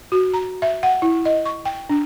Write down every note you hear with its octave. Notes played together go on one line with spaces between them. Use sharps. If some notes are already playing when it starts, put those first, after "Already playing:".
F#4
A#5
E5
F#5
E4
D#5
C#6
G5
D4